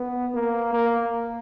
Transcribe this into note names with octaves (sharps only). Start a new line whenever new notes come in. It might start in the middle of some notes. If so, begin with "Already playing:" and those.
Already playing: B3
A#3
A#3